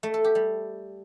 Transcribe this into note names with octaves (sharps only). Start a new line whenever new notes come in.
A3
A4
G4
G3